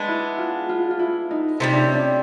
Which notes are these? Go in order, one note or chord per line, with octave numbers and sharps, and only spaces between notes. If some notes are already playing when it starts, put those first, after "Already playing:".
Already playing: G#3 B3 D4
E4
F4
F4
F4
E4
D#4
C3 D#3 G3 D#4
D4
C#4
D4